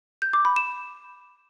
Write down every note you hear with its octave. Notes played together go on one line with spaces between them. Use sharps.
G6
D6
B5
E7